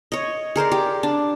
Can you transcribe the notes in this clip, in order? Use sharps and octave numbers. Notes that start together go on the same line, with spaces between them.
C#5 D#5
G#4 A#4 C5 D5
G4
D4